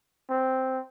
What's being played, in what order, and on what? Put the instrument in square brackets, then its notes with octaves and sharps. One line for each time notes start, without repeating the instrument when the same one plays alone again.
[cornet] C4